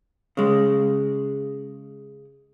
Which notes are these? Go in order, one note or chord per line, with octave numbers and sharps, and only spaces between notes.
C#3 G#3